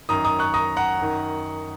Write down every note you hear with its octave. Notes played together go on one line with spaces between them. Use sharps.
F#2 D#3 A#5 D#6
A#5 D#6
C#6 F#6
A#5 D#6
F#5 A#5
F#2 D#3